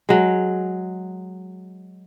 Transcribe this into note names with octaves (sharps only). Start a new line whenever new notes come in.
F#3 G#3